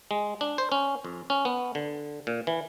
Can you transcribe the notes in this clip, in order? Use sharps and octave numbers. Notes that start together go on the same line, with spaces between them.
G#3
D4
C5
C#4
F2
C#4
B3
D3
A#2
E3